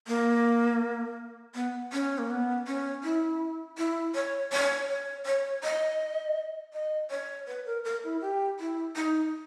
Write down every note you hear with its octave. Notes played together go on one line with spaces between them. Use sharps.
A#3
B3
C#4
A#3
B3
C#4
E4
E4
C#5
C#5
C#5
C#5
D#5
D#5
C#5
B4
A#4
A#4
E4
G4
E4
D#4